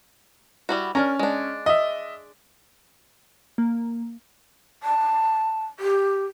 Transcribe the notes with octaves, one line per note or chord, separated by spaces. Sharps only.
G3 E4 F#4
C#4 D4 A#4 A#5
G#3 D4
D#5 E5
A#3
A5
G4